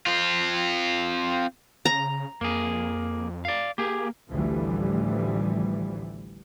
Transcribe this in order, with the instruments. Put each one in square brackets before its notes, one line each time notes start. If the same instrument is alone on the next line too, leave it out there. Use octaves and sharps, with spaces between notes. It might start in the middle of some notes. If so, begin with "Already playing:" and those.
[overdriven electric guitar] C4 F4
[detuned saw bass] C#3 [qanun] A#5
[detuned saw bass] F2 [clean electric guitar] A#3 G#4
[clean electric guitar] D5 F5
[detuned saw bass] A#3 [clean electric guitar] G4 G#4
[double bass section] A1 D2 E3 F3 G3